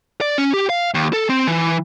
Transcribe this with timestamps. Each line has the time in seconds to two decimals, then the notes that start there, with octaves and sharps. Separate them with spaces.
0.21 D5
0.38 C#4
0.54 G4
0.69 F5
0.94 D#2
1.13 A4
1.29 C4
1.47 E3